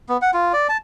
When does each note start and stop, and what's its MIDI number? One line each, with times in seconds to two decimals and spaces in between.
0.09 0.17 59
0.22 0.31 78
0.34 0.53 65
0.53 0.67 74
0.69 0.77 81